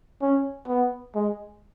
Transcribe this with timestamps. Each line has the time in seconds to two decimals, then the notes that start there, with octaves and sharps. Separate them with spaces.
0.22 C#4
0.68 B3
1.15 G#3